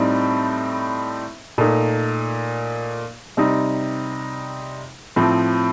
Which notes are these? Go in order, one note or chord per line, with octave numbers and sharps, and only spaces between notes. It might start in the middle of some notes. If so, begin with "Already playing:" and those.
Already playing: A2 G3 C4 D#4
A#2 A3 D#4
C3 G3 C4 D#4
A2 F3 C4